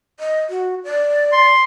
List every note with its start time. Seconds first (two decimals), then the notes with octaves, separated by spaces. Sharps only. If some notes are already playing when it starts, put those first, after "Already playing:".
0.20 D#5
0.50 F#4
0.84 D5
1.32 C6